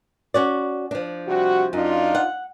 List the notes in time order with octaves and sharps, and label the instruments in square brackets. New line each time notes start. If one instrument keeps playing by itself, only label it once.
[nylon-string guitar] C#4 F#4 D5
F3 D4
[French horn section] C3 G3 F#4
[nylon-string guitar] F#2 [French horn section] D4 D#4 F4
[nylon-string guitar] F#5